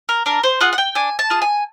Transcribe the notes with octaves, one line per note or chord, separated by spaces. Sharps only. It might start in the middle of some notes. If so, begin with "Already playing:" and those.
A#4
D4 A#4
C5
F4 G#4 F#5
F#5
G5
D4 G#5
A5
F4 G#4
G#5